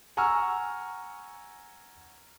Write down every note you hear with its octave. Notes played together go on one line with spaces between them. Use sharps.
F#5 G#5 A#5 C#6 E6 F6